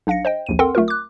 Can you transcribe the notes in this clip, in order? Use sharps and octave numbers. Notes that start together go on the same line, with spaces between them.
B1 D4 F5 A#6 C#7
C5 D#5 G5
A#1 D#2 D#7
C4 A4 A#4 F#5 G5 C6
B1 A3 F4 A#4
D6 F#6